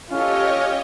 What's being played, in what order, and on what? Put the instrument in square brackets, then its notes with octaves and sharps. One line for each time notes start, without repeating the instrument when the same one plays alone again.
[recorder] C#4 [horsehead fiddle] F4 [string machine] G4 C#5 D#5 [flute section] A4 F6